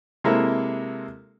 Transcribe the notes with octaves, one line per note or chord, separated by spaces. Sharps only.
C3 G#3 A#3 E4 A4